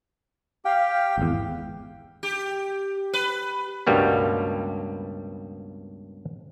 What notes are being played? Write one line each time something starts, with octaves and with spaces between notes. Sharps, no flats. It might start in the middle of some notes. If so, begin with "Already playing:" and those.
G4 F5 G5
G#1 E2
G4
B4
C#2 G2 B2 G3 A#3 B3